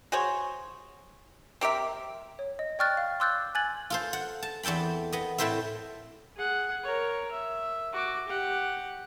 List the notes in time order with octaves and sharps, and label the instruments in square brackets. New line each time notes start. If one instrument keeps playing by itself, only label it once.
[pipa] F#4 G#4 C5 C#5
C4 G4 A#4 E5
[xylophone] C#5
D#5
D5 G5 C#6 F6 F#6 A6
F5
C6 D6 E6 F#6 G6 A6
G#5 F#6 G#6 A6 F#7
[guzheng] F4 A4 C5
F#5
A5
E2 C4 A4 G5 B5
B3 D#5
A2 A3 C4 E4 C5 E5
[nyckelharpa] G#4 F#5
A#4 C#5
E5
F#4 D6
G4 F#5